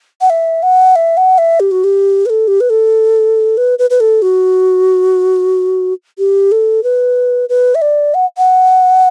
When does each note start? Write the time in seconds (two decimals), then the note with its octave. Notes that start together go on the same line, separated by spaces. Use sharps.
0.21 F#5
0.30 E5
0.63 F#5
0.96 E5
1.17 F#5
1.38 E5
1.60 G4
1.71 F#4
1.84 G4
2.26 B4
2.30 A4
2.48 G4
2.60 B4
2.70 A4
3.57 B4
3.79 B4
3.90 B4
4.00 A4
4.22 F#4
6.18 G4
6.52 A4
6.83 B4
7.49 B4
7.75 E5
7.82 D5
8.14 F#5
8.38 F#5